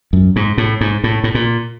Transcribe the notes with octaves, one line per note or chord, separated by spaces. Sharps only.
F#2
G#2
A2
G#2
A2
A2
A#2